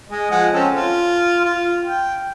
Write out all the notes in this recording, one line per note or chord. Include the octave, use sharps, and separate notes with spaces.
G#3 D#5
F3 G#3 F#5
C4 C#4 A4
F4
F4
G5